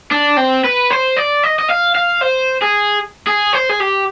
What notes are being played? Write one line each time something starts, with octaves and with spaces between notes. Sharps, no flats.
D4
C4
B4
C5
D5
D#5
D#5
F5
F5
C5
G#4
G#4
C5
G#4
G4